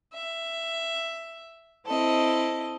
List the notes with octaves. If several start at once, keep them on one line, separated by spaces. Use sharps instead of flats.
E5
C4 E4 A4 D#5